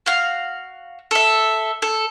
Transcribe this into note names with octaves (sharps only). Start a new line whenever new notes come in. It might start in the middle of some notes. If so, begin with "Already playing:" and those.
F#4 F5
A4 E5
A4